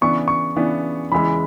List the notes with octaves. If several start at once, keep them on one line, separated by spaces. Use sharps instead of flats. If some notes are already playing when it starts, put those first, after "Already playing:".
C#3 E3 B3 D4 C#6
C#6
C#3 E3 B3 D4
E2 C#3 E3 G#3 B5